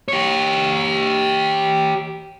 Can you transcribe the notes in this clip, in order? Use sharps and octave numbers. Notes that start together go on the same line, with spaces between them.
G4 C#5